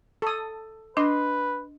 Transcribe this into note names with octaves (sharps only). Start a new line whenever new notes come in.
A4 D#6
D4 B4 D#5 C6